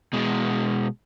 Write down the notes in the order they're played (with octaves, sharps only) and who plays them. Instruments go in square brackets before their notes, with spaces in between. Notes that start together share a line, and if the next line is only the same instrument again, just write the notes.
[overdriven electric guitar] B2 G#3